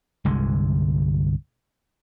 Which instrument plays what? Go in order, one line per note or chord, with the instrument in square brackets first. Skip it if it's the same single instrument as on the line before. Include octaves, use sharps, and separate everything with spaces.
[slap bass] G1 C2 D3 G#3